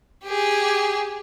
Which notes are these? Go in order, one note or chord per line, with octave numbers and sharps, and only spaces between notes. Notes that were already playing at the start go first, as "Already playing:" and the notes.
G4 G#4